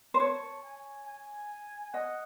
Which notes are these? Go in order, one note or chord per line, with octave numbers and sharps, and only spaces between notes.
C5
C#5 A5
G#5
G#5
D#5 F#5